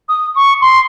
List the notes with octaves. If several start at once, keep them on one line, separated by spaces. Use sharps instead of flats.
D#6
C#6
C6